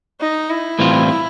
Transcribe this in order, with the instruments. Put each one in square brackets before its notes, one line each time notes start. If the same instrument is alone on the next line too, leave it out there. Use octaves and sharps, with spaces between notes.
[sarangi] D#4
E4
[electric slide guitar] A2 E3 G3 C4 F4